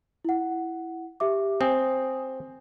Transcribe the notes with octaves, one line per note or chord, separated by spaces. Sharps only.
E4 F#5
G4 E5 D6
C4 G#5 D#6